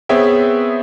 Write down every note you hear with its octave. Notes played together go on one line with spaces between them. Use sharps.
B3 C4 G#4 C#5 E5 G5